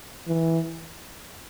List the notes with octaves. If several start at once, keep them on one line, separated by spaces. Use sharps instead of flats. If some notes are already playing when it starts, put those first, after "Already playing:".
E3